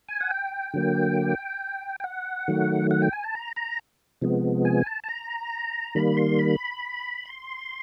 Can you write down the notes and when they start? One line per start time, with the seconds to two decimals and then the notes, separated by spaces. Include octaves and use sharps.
0.09 G#5
0.21 F#5
0.31 G5
0.74 D3 F#3 A#3
2.00 G5
2.04 F#5
2.48 D#3 F#3 A3
2.91 F#5
3.02 G5
3.13 G#5
3.24 A5
3.35 A#5
3.56 A#5
4.22 C3 F3 G#3 B3
4.65 G#5
4.86 A5
5.04 A5
5.08 A#5
5.95 D#3 G3 A#3 B5
6.17 C6
6.39 B5
7.25 C6